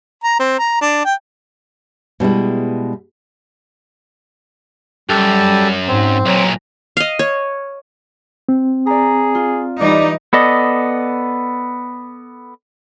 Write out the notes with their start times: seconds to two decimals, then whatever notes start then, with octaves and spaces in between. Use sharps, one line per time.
0.24 A#5
0.39 C4
0.59 A#5
0.81 D4
1.05 G5
2.20 B2 G3 G#3 E4
5.09 F#2 G3 G4 A4
5.88 G#2 C4
6.26 B1 A#2 F#3
6.97 D#5 F5
7.19 C#5
8.49 C4
8.87 G#4 D5 A#5
9.35 F4
9.81 E3 G3 D#4 D5
10.33 B3 A4 D5 D#5